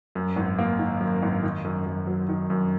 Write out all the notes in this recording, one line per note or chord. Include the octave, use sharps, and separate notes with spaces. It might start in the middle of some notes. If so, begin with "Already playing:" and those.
F#2
G#1
A#3
D#3
F#2
G#1
D#3
F#2
F#2
F#3
D#3
F#2